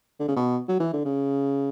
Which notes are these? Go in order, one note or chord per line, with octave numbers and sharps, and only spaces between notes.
D3
C#3
B2
F#3
E3
D3
C#3